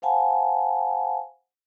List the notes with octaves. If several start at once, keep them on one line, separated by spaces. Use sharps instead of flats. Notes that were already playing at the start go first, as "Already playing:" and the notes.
C5 F5 F#5 G#5 A5 B5